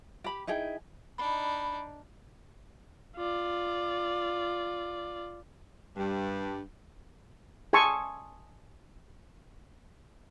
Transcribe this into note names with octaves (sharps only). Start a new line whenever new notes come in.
G4 B5
D#4 E4 G#4 G5
D4 D#4 B5
F4 D5
G2
G#4 G#5 A5 C6 C#6 E6